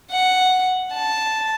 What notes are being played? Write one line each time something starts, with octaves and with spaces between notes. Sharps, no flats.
F#5
A5